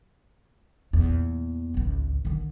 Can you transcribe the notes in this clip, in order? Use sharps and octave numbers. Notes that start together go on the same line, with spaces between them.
E2 A#2
G#1 C#2
D3 D#3